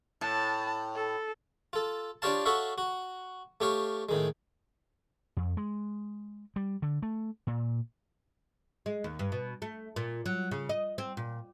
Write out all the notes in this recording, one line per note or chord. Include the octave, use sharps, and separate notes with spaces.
A2 A5
A4
F4 A4
D4 F4 G4 C#5 F5 A5
F#4 A4 C#5 E5 F5
F#4
A3 G4 C#5 F5
A2 D#3 G#3
F2
G#3
G3
D3
A3
A#2
G#3
D#2
G2
B2
A3
A#2
F#3
C#3
D#5
C4
A#2